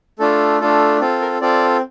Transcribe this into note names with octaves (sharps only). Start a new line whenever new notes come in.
A3 D4 F4 A4
A3 D4 F4 A4
C4 F4 A4
A#4
C4 F4 A4 D5